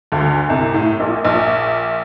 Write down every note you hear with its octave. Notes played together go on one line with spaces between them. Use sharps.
D2 D3
C2 C3
A2
A#1 A#2
A#1 A#2